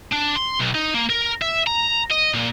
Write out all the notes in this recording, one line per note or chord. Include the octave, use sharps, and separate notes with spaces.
D4
C6
B1
D#4
A#3
A#4
E5
A#5
D#5
A#2